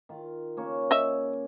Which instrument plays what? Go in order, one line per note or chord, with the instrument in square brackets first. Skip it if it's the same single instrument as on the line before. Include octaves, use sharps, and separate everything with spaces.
[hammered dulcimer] D#3 F4
C#3 A#3 C#5
[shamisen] D#5 E5